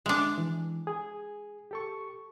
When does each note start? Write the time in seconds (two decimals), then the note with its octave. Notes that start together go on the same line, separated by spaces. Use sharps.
0.06 G#3 D4 E5
0.38 E3
0.87 G#4
1.71 G4 A4 C#6